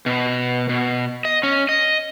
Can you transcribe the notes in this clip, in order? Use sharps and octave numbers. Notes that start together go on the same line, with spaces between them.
B2
B2
D#5
C#4
D#5